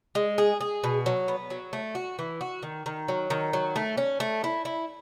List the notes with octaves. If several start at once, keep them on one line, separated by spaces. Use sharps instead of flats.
G#3
G#4
G#4
B2
F#3
B3
F#3
A3
F#4
E3
F#4
D#3
D#3
F#3
D#3
F#3
A3
C#4
A3
E4
E4